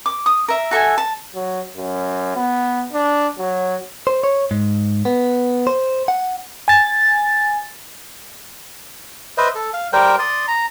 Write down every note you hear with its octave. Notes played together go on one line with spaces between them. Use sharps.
D6
D#6
A#4 E5
F#4 A4 E5 G#5
A5
F#3
F#2
B3
D4
F#3
C5
C#5
G#2
B3
C5
F#5
G#5 A6
B4 C5 D#5 E5
A4
F5
G3 A#4 C5 G5
D5 C6 D#6
A#5